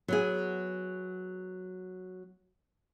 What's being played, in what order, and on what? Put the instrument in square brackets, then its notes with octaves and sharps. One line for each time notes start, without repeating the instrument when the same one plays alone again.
[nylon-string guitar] F#3 B3 G#4